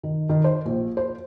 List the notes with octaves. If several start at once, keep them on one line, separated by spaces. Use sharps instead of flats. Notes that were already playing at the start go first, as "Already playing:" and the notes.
D#3
D#3
C5
A#1
C5